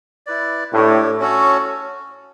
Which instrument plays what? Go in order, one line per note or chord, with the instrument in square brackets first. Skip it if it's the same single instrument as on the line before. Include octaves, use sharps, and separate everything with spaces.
[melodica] E4 B4 D5
[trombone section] A2 [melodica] D4 G4 C#5
[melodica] C#4 F#4 A4 C#5